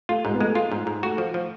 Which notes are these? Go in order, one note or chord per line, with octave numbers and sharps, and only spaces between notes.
A3 F4
G#2 G#3
B3
G#3 A3
F4
G#2
G#2
A3 F#4
F3
F3